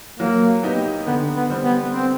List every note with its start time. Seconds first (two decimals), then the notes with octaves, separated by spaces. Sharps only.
0.20 F#3 A#3
0.63 B3 D#4 G4
1.06 D3 B3
1.36 B3
1.50 G3 C4
1.65 B3
1.93 C4